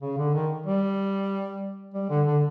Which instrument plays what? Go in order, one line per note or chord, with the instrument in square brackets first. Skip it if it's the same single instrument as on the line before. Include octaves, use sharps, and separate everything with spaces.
[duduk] C#3
D3
D#3
G3
G3
D3
D3